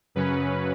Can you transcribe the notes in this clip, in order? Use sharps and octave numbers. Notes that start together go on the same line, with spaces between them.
F#2 C#3 F#3 C#4 B4